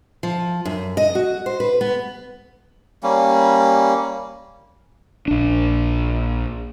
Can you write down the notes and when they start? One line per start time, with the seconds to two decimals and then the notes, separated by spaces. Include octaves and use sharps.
0.23 F3
0.65 F#2
0.97 D#5
1.15 F#4
1.46 C5
1.60 B4
1.81 B3
3.03 G3 A#3 C#4
5.28 A#1 D4